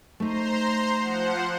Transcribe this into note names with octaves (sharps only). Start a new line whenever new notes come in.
A3 D#4 C5 A#5 C6
F3 C5 F#5